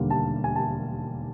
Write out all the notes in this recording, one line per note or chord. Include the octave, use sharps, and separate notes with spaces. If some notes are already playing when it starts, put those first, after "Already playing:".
Already playing: E1 D#2 D3 G3 A#3
A5
G#5
A5